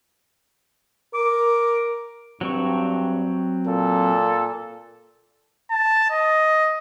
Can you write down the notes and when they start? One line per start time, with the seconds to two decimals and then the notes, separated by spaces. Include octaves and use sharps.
1.14 A#4 D6
2.41 G2 F#3 C4 C#6
3.67 A#2 A4
5.71 A5
6.11 D#5